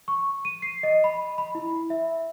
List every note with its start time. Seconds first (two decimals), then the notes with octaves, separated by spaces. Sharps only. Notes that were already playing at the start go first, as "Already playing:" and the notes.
0.08 C#6
0.45 D#7
0.62 C7
0.83 D#5
1.04 B5
1.38 B5
1.55 E4
1.90 E5